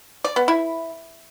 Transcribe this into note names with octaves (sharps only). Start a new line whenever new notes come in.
D5
B3
E4